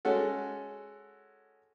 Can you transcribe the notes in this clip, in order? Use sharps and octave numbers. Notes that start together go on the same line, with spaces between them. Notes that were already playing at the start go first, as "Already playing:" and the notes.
G#3 C#4 F#4 A4